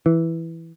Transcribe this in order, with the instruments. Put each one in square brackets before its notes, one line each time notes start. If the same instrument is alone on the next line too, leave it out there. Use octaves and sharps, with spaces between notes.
[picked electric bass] E3